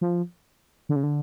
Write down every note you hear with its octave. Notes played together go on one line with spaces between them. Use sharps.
F3
D3
C#3
D3